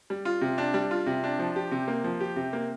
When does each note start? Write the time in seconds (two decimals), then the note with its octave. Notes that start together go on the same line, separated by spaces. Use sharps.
0.10 G3
0.25 F4
0.41 C3
0.58 D4
0.74 G3
0.91 F4
1.06 C3
1.24 D4
1.39 F3
1.56 G4
1.71 C3
1.88 A#3
2.04 F3
2.20 G4
2.36 C3
2.53 A#3